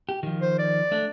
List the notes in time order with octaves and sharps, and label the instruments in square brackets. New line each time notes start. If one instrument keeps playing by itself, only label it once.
[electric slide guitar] G4
D#3 F3
[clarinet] C5
D5
[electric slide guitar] A3 D4